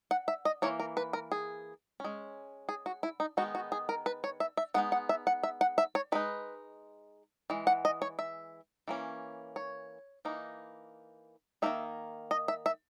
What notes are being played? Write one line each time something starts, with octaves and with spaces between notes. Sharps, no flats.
F#5
E5
D#5
E3 A#3 C#5
A#4
B4
A#4
G#4
G#3 C#4
G#4
F#4
E4
D#4
D#3 G#3 B3 D#4 F#4
F#4
G#4
A#4
B4
C#5
E5
E5
G#3 B3 D#4 F#5
F#5
E5
F#5
E5
F#5
E5
C#5
G#3 D#4 B4
E3 G#3
F#5
D#5
C#5
E5
E3 A#3 C#4
C#5
E3 A#3 D#4
D#3 A#3 D#4 E5
D#5
E5
E5